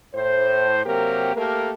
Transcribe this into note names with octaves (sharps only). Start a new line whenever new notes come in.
A2 C5
C3 F#3 A#3 C4 G4 A#4
A3 A#3 G4 A4 A#4